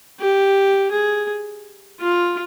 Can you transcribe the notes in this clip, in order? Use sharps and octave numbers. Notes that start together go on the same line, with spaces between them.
G4
G#4
F4